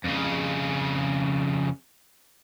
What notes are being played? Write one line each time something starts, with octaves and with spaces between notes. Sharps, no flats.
F2 C#3